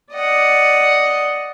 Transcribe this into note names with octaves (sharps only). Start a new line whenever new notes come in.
D5 D#5 F#5